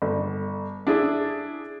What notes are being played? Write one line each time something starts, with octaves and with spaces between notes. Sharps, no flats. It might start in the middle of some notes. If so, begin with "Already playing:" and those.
G1
D4 E4 G#4